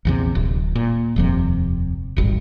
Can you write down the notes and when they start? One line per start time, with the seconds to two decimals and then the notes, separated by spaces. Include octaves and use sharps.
0.05 A#1 E2 C3
0.35 D1
0.75 A#2
1.16 D#1 F2 C3
2.17 D1 G#1 G2